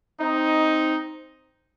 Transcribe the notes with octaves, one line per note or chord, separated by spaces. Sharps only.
C4 D#4